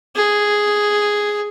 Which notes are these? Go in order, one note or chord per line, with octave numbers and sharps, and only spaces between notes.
G#4